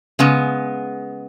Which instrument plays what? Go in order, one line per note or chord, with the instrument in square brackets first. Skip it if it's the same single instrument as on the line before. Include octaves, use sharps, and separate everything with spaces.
[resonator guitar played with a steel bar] C#3 G#3 B3